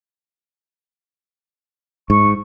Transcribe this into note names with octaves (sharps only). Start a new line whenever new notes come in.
G#2 C#6